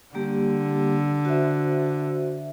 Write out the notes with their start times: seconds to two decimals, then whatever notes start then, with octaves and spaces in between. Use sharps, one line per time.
0.15 D3 G3 A#3 G4
1.25 F#4 C5 E5